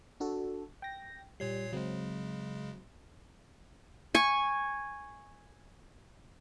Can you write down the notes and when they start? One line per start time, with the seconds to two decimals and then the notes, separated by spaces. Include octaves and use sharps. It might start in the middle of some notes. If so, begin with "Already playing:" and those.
0.20 D4 F#4 A4
0.82 G5 A#6
1.40 A#2 G3 C#5 C7
1.73 C#3 F#3 G#3 C4
4.15 G#5 C#6